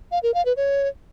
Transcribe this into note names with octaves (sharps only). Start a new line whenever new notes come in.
F5
A#4
F5
B4
C#5